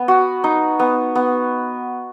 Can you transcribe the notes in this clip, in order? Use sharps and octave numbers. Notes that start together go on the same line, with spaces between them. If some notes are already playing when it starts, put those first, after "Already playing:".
Already playing: B3
F#4
D#4
B3
B3